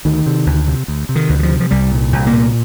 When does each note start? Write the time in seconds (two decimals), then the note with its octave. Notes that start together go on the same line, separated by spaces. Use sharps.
0.05 D2 D#3
0.26 C3
0.46 D2
0.68 C3
0.88 D2
1.09 C3
1.16 D#3
1.29 D2
1.39 D#3
1.43 F3
1.50 C3
1.60 F3
1.71 C2 G3
1.91 A#2
2.12 C2
2.27 A#3
2.33 A#2